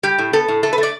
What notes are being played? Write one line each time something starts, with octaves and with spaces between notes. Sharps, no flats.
G3 G4
A2
B3 A4
A2
A3 A4
B4
A3
D5